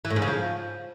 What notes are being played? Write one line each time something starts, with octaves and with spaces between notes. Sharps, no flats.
E3
A2
G#2
C#3
F3